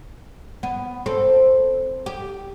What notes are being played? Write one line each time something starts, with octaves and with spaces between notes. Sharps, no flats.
B3
C4 A4
G4